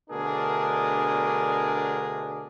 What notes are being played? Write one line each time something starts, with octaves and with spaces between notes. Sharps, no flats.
D2 B2 D4 G#4 A#4